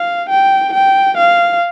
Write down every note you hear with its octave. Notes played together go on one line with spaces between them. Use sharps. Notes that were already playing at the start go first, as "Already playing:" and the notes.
Already playing: F5
G5
G5
F5